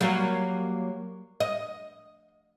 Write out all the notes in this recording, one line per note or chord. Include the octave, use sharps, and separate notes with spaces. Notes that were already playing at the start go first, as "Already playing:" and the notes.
F#3 G3 A#3
D#5